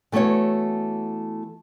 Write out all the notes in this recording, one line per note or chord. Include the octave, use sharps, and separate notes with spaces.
E3 A3 B3 F#4 C#5